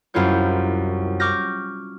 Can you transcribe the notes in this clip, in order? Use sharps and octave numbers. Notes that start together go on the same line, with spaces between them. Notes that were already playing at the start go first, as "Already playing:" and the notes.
C2 F#2 E4 F4 C#5 G6
C#6 D6 F6 G6 A#6